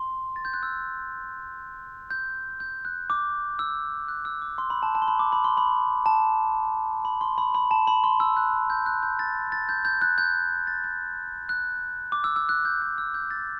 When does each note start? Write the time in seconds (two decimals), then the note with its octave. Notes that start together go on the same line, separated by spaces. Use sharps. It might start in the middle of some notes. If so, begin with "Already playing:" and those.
Already playing: C6
0.36 A6
0.45 G6
0.54 F#6
0.63 E6
2.11 G6
2.60 G6
2.85 F#6
3.10 D6
3.59 E6
4.08 F#6
4.25 E6
4.42 D6
4.58 C6
4.70 B5
4.83 A5
4.95 A5
5.02 C6
5.08 B5
5.19 D6
5.32 B5
5.44 C6
5.57 B5
6.06 A5
7.05 B5
7.21 C6
7.38 B5
7.55 B5
7.71 A5
7.87 B5
8.04 C6
8.20 E6
8.37 F#6
8.70 G6
8.86 F#6
9.03 G6
9.19 A6
9.52 A6
9.69 G6
9.85 G6
10.02 F#6
10.18 G6
10.67 A6
10.84 G6
11.49 F#6
12.12 D6
12.24 E6
12.36 E6
12.49 F#6
12.65 G6
12.82 F#6
12.98 E6
13.14 G6
13.31 A6